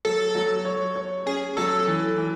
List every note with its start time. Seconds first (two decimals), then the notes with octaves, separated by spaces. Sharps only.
0.05 F#3 A4
0.35 F#3
0.65 C#5
0.96 C#5
1.26 C#4 G#4
1.57 F#3 A4
1.87 E3
2.18 E3